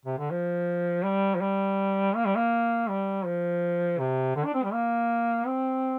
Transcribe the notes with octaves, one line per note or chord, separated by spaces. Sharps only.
C3
D3
F3
G3
F3
G3
A#3
G3
A#3
G3
F3
C3
D3
D4
C4
G3
A#3
C4